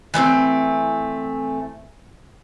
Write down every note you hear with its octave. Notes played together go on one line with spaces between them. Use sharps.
E3 A3 B3 C4